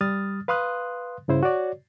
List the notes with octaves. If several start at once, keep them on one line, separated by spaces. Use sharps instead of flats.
G3 D#6 F6 A6
B4 F5 C6 D#6 F#6
G2 C#3 E4 C5
F#4 C#5 D5